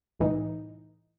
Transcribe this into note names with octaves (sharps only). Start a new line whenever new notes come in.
C2 A2 E3 D#4